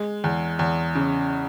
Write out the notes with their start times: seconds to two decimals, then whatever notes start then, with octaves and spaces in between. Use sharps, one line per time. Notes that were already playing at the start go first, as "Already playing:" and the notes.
Already playing: G#3
0.24 E2
0.59 E2
0.95 C#3